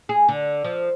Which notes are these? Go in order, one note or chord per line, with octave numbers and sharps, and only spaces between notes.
G#4
D3
F3